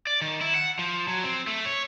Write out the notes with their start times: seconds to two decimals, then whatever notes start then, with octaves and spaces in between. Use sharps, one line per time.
0.07 D5
0.21 D#3
0.41 E4
0.55 F#5
0.79 F3
1.08 F#3
1.24 C4
1.47 A3
1.66 C#5